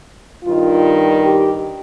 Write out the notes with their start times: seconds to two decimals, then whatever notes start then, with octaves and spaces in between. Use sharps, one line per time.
0.43 G2 D#3 F4
1.21 G4